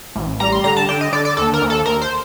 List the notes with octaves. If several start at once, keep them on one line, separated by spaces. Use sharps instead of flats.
A1
G3 A#5
C6
D3 A#5
A5
D3 G5
D#5
D3 D5
D5
D#2 A4
A#4
D#2
A4
D#2 A#4
C5